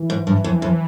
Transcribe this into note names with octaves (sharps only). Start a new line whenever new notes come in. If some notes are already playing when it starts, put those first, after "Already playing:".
Already playing: E3
G#2
G2
F2
F2